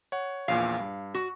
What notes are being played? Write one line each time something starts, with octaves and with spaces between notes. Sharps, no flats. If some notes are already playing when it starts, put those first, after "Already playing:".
C#5 F#5
A#1 E2 A#2 F5
G2
F#4